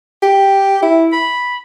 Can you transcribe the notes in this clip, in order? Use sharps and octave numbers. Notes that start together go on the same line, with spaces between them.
G4
E4
B5